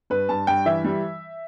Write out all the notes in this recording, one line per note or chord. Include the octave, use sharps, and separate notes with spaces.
G2 B4
G2 A5
G2 G5
E3 E5
G3